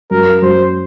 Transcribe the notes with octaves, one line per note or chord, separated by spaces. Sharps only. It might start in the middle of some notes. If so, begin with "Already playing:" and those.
F#2 A#4
F#2 C5